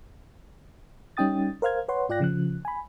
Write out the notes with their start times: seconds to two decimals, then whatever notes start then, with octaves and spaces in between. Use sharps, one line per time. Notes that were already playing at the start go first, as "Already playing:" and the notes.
1.17 G3 C#4 D#4 G5 D#6 A6
1.62 A#4 C5 F5 F6 G#6
1.88 B4 C#5 F#5 C6
2.09 G#2 F4 D5 G5 F#6 A#6
2.20 C#3 F3 F#6
2.65 G#5 B5